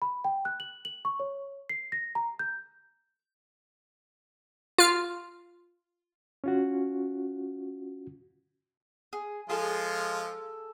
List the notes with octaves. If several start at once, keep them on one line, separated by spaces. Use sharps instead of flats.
B5
G5
F#6
F#7
F#7
C#6
C#5
C7
A#6
A#5
G6
F4 F6
C#4 F4 F#4
G#4
F3 G#3 F4 G#4 A4